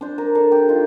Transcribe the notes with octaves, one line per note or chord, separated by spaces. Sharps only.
D4 C5
A#4
D4 A4
G4
D#3 F4